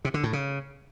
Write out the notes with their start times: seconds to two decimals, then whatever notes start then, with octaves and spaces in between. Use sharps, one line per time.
0.05 C3
0.14 D3
0.24 A2
0.33 C#3